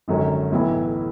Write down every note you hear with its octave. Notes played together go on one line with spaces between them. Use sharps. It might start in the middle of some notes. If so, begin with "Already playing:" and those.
G#1 F#2 D3 F#3 C#4
B1 A2 E3 B3 E4